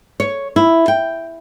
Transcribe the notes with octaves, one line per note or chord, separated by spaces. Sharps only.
C#5
E4
G5